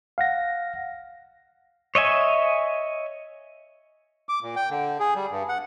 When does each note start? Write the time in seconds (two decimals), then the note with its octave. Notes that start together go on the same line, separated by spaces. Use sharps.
0.18 F5 F#5 A#6
1.95 C#5 D#5 E5 G#5
4.29 D6
4.42 A#2
4.56 G5
4.70 D3
5.00 G#4
5.16 G3
5.31 G2
5.49 F#5